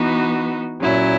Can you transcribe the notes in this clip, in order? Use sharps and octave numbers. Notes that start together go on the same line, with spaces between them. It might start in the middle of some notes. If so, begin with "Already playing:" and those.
Already playing: E3 B3 D#4 F#4
A#2 F#3 C#4 E4